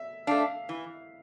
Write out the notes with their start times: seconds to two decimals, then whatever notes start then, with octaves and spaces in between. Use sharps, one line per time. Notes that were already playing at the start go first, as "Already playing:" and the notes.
Already playing: E5
0.27 A3 D4 F5
0.69 E3